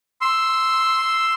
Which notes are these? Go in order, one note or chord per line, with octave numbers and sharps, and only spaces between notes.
C6 E6